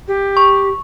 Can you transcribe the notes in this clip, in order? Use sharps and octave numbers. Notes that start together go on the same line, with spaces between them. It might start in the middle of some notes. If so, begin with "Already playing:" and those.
G4
C#6